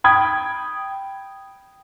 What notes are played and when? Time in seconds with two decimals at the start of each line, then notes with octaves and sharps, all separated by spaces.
0.04 G5 B5 D#6 G#6